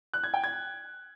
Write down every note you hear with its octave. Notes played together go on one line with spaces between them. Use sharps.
F#6
G#6
G5
G#6